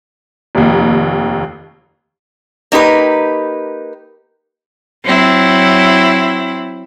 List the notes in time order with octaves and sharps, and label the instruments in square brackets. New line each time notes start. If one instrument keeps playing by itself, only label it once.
[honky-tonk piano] F1 D#2
[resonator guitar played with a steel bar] A#3 D#4 G4 B4
[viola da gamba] F#3 C4 E4